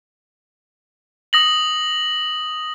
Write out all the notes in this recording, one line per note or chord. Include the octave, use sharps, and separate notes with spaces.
D#6 A#6 F#7